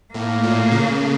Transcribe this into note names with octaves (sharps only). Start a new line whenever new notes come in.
A2 A#3
A#2
C#3